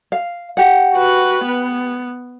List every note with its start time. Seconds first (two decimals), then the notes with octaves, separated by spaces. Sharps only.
0.12 F5
0.57 G4 F#5
0.94 F#4 B4
1.45 B3